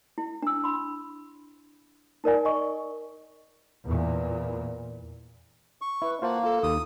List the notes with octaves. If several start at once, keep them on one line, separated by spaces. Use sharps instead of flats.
E4
D4 E6
B5 C6
D#4 A#4 D5 G#5
D#5 C#6
E2 A#2
C#6
E4 B4
A#3 F4 C5 F#5 A5
F4 A4
D#2 D#6